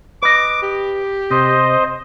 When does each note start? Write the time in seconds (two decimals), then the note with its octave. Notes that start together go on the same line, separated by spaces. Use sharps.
0.22 B4 D#5 D6
0.62 G4
1.31 C3 C5 D#5